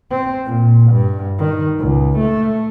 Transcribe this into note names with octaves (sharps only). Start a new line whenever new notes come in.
C4
A#2
G2
D#3
C#2
A3